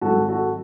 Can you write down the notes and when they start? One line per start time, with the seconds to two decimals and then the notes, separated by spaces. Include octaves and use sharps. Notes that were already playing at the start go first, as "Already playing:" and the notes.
0.01 G#1 G#2 F#3 F#4 A4
0.29 F#4 A4